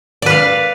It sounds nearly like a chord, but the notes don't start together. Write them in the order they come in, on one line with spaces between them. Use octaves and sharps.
D5 B4 F5